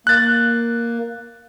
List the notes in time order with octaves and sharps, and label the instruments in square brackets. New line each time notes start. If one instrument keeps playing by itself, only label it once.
[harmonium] A#3 [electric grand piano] F#6 A6